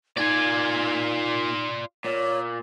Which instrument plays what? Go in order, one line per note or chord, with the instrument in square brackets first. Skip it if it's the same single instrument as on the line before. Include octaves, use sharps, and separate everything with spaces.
[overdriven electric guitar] A#2 G#5 [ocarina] D#4 [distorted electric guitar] F4 D5
[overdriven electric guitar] A#2 [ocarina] C#5